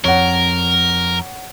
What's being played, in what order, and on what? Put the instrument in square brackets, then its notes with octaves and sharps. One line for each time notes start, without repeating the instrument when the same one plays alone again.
[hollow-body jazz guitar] F2 [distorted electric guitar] A#4 [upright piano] C#5 F#5